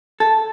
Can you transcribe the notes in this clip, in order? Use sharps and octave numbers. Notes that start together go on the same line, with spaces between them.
A4